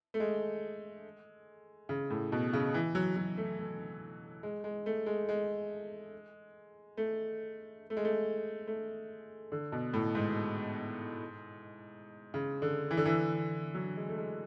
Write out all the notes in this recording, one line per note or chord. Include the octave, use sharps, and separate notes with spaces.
A3
G#3
C#3
A2
B2
C#3
E3
F#3
F#3
A3
A3
G#3
G#3
A3
G#3
G#3
A3
A3
G#3
A3
A3
D3
B2
A2
G#2
C#3
D3
E3
D3
E3
F#3
G#3
A3
G#3